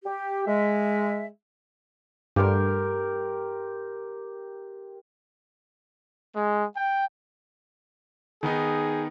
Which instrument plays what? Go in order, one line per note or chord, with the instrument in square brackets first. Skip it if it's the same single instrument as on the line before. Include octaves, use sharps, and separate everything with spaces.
[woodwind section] G4
G#3 E5
[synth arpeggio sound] G2 [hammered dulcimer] G4 A#4 C6
[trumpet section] G#3
G5
[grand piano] D#3 B3 D#4 [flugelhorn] G#4